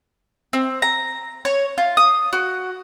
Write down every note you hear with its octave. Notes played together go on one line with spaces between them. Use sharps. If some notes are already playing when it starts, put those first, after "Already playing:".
C4
A#5
C#5
F4
D#6
F#4